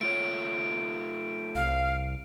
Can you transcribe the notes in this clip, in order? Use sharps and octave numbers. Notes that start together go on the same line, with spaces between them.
A3 F4 C#5 D7
C2 F5